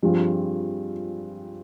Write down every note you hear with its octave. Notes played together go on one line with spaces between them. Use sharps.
G2 F3 G3 C4 F4 G#4